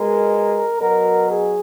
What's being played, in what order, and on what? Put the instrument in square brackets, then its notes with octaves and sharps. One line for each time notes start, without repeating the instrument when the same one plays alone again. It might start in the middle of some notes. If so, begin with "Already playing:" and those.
Already playing: [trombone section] B2 G#3 A#4
B2 F#3 A#4
G#4